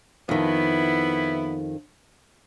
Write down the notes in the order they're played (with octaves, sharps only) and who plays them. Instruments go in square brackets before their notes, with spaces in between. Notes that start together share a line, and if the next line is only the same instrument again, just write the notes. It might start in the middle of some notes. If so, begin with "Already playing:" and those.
[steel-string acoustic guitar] F2 D#3 [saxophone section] B3 E4